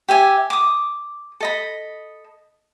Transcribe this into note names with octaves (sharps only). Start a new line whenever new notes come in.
G4 E5 G#5
D6 D#6
A4 D#5 B5